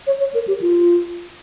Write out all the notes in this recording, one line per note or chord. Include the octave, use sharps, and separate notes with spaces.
C#5
C#5
A#4
G4
F4